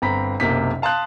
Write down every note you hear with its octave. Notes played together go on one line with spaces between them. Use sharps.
G1 C4 A#5 B5 B6
F#1 B1 C3 A#3 B6
F5 A5 C6 D#6 F#6